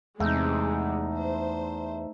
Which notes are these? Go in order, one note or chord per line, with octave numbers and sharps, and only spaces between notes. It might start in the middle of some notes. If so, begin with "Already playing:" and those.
E2 C3 G#3 A3 D#4
C5